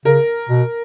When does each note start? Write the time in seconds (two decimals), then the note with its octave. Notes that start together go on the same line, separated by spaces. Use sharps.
0.05 C#3 A#4
0.49 B2